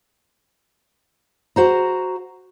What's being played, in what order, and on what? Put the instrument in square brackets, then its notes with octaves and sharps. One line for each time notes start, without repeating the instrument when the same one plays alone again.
[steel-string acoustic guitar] F#4 C5 A#5